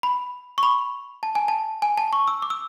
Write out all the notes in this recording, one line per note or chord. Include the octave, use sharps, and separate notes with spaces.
B5
C#6
B5
A5
G#5
A5
G#5
A5
C#6
E6
D6
E6